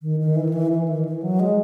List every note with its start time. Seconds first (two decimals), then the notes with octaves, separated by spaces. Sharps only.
0.02 D#3
0.20 D#3
0.36 E3
0.49 D#3
0.53 E3
0.71 E3
0.88 D#3
1.05 E3
1.22 F#3
1.40 G#3